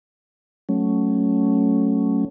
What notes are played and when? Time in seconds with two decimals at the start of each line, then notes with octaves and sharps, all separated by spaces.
0.69 F#3 A3 C#4